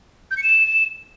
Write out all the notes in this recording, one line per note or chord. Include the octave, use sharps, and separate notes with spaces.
G6
C#7
E7